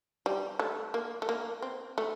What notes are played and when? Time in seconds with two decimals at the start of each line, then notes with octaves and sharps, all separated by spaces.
0.26 G3
0.59 A3
0.94 A#3
1.22 A3
1.29 A#3
1.62 C4
1.98 A3